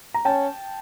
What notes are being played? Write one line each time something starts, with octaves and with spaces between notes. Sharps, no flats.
A#5
C#4 G5 A5